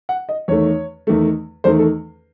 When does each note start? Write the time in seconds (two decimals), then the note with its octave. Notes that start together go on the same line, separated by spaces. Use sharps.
0.09 F#5
0.29 D#5
0.48 E2 D#3 A3 C#5
1.07 E2 D#3 A3
1.64 E2 D#3 A3 C5
1.79 A4